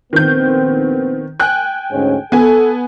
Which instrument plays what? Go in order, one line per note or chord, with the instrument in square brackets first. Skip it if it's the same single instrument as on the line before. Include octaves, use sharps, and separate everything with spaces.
[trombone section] A#1 B3 C4 [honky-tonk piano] D#3 G6
[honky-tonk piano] G5 G#5 F#6
[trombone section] D2 G#2 C#4
[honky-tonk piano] B3 G#5 [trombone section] A4